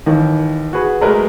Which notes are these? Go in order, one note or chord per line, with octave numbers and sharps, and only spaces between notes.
D#2 D#3 E3
F#4 G#4 B4
F#3 G#3 A3 A#4 B4